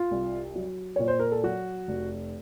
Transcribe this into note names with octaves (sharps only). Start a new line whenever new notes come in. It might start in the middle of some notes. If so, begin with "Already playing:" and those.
Already playing: F4
C2
F#3
A#2 C#5
C5
A#4
A4
F#3 F#4
F1